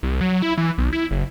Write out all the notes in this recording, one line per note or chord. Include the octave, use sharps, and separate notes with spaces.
C2
F#3
E4
E3
B1
E4
F#1